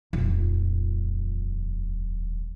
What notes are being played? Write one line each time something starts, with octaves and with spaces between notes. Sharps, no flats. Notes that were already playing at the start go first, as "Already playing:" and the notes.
D#1 F2